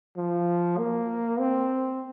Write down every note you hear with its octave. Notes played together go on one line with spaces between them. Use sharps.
F3
A#3
C4